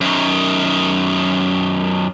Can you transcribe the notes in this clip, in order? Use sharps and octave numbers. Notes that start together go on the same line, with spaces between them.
F#2 D#3